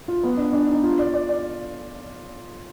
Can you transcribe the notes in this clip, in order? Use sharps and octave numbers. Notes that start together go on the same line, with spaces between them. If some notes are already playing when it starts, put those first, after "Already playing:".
F4
B3
D4
D4
D#4
F4
D5
D5
D5